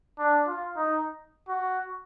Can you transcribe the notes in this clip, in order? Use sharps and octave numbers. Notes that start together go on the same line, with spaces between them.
D4
F4
D#4
F#4